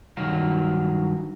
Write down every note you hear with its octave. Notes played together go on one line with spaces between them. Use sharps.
G2 D#3 F#3 F#4 A#4 F5